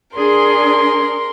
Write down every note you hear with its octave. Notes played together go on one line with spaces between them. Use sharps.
D4 G#4 A#4 C6